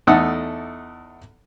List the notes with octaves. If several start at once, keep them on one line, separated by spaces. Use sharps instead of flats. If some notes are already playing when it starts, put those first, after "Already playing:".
E2 A3 D#4 A4 F#5 E6